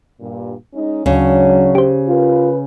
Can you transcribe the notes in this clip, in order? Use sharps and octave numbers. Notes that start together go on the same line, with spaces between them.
G2 A#2
G#3 C#4 D#4
D2 G#2 C#3 F#3 D4 C#5
G4 C5
F4 A#4 B4